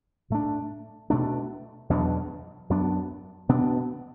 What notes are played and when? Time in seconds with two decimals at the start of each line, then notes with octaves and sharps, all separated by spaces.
0.30 A2 A3 D4
1.10 B2 A3 D4
1.90 E2 B2 F#3 D4
2.70 F#2 F#3 B3 D4
3.49 B2 B3 D4